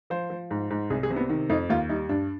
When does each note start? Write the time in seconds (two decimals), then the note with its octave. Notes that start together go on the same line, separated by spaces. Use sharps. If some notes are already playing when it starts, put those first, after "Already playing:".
0.10 F3 C5
0.30 F3
0.51 G#2
0.70 G#2
0.90 C2 G#4
1.03 G#4
1.10 C3
1.16 B3
1.29 D#3
1.50 F2 D#4
1.69 D#2 F4
1.89 G3 D#4
2.09 G2 D4